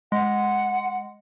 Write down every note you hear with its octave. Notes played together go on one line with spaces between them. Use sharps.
G#3 F#5